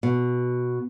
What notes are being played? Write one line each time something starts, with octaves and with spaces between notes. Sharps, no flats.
B2